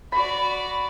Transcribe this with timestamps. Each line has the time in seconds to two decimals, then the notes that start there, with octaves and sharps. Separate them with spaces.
0.12 F#4 D5 B5